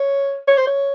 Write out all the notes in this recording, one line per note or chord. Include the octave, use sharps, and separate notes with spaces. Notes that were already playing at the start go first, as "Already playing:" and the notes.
Already playing: C#5
C#5
C5
C#5